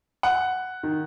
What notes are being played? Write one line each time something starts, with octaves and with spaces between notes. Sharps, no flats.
F#5
D#3